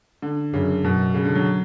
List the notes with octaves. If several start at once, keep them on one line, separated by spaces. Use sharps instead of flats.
D3
F#2 C#3
F#2 B2
C#3
D3
F#3